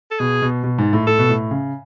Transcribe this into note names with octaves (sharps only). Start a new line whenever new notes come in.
A4
B2 G#4
B2
B2
G#2
A2
A2 A4
B2
A2
C#3